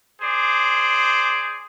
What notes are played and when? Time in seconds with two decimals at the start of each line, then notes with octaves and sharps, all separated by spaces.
0.21 G#4 C5 D5